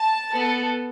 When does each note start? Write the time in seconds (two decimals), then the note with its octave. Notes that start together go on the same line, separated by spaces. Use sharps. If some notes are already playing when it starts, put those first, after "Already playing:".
Already playing: A5
0.32 B3 A4